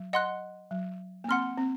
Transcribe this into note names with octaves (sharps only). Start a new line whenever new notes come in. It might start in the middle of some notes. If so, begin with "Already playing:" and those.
Already playing: F#3
D#5 F#5 C6 F#6
F#3
A#3
C4 F#5 C6 F6
C4